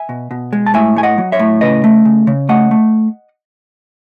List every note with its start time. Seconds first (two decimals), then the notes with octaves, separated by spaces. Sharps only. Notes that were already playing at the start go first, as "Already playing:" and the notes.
Already playing: E5 G#5
0.09 B2
0.31 B2
0.53 G#3
0.66 A5
0.74 A2 E5 G#5
0.96 A3 G#5
1.03 D#5 F#5
1.18 F#3
1.32 C#5 E5
1.39 A2
1.61 C#3 B4 D#5
1.84 A3
2.05 C#3
2.27 C#3
2.49 A3 D#5 F#5
2.71 A3